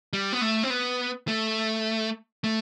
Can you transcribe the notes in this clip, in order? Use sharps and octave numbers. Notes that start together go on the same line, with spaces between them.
G3
B3
A3
C4
B3
A3
A3